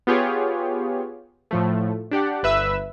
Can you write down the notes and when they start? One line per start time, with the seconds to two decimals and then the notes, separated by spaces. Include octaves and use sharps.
0.07 B3 F4 G4 G#4 C#5
1.51 A2 F3 A3
2.11 D4 G4 D5 F#5
2.43 G1 B4 E5 E6